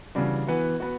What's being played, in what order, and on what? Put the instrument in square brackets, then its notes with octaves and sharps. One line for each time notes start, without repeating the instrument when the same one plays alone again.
[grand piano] C#3 E3 G3 D4 F#4
E3 B3 F#4
B3 F#4